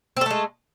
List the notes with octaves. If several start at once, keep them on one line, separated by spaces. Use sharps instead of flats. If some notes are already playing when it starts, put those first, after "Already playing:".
G#3 A3 C4 A4